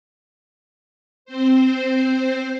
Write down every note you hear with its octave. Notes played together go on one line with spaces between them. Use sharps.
C4 C5